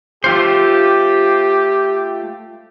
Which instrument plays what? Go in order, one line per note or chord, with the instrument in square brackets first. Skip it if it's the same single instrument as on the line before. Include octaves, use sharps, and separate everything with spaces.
[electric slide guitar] A3 F4 C5 [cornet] G4